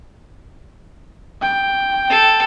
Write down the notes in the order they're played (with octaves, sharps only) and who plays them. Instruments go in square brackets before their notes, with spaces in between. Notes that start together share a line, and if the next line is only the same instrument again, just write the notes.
[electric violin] G5
[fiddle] A4